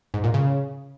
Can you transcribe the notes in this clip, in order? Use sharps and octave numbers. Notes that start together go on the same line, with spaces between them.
G#2
A#2
C#3